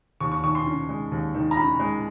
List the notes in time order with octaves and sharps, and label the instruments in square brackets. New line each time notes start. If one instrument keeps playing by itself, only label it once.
[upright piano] D#2 C#6
C#6
D#3 C#6
C6
C#4
G#3
D#2
D#3
A#5
C#4 B5
G#3